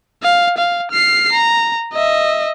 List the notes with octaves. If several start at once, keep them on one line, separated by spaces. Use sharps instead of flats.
F5
F5
F6 C7
A#5
D#5 E5